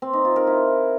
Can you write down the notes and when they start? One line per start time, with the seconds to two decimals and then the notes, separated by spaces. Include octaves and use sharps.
0.02 C4
0.13 D#4
0.25 F4
0.36 A#4
0.47 E4